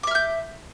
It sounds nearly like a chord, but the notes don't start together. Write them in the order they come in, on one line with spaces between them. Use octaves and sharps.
D6 E5 F6 G6